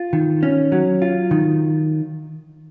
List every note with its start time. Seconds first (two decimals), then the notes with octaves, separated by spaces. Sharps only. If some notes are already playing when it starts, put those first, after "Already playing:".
Already playing: F4
0.13 D#3
0.43 C#4
0.72 F#3
1.02 F4
1.31 D#3